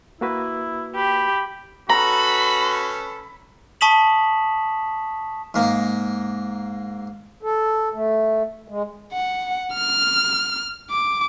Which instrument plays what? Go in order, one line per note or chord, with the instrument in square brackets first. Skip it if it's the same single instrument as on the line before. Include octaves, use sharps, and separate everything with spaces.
[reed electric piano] A#3 F#4 B4 [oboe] E4
[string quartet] G4 [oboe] B5
[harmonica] C#4 A4 B4 [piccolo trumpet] F#4 [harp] A#5 [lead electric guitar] B5
[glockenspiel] A5 C#6 D#6 B6 E7 F#7
[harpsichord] G#2 A#3
[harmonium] A4
A3
G#3
[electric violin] F#5
F6
D6